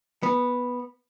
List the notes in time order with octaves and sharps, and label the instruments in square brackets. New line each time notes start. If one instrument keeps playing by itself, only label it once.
[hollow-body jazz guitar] B3